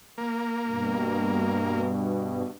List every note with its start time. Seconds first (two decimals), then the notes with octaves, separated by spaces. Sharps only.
0.18 A#3
0.66 G2 B2